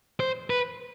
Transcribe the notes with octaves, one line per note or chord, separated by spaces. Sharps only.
C5
B4